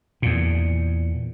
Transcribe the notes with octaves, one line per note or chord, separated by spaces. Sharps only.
E2 A#2